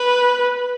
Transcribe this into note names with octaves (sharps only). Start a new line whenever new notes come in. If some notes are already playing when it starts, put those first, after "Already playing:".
Already playing: B4